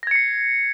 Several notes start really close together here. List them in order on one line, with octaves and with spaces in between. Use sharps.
A#6 G#6 C#7 C7